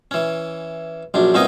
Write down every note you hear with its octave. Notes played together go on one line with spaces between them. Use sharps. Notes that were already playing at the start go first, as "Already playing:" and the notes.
E3 C#4
A#1 F#2 D4
C2 A#2 B3 C#4 D#4 D#5